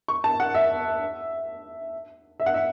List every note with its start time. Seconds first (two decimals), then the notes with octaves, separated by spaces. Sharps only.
0.08 C#6
0.24 A5
0.40 F#5
0.55 E5
2.40 E5
2.46 F#5
2.54 E5